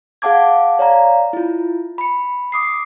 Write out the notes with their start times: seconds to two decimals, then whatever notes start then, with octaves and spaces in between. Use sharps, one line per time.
0.22 G#4 F5 F#5 A5 D6 G#6
0.79 C#5 D5 F5 A#5
1.33 E4 F4
1.98 B5 C#7
2.52 D6 D#6 C7